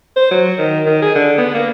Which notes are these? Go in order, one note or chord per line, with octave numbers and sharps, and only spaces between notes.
C5
F#3
D#3
D#3
G#4
D3
B3
A#3